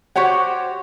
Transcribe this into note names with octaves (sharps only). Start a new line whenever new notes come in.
F#4 G4 C5 C#5 F#5